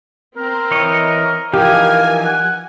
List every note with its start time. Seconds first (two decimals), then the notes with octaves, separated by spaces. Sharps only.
0.36 C4 A#4
0.71 E3 C#5 D#5
1.54 E3 F3 D#4 G4 A#4 F5 G#5
2.25 F#5